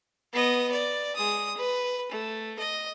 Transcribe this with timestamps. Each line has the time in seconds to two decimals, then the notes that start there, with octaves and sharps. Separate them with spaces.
0.33 B3 D#5
0.72 D5
1.15 G#3 D#6
1.57 B4
2.11 A3
2.59 D#5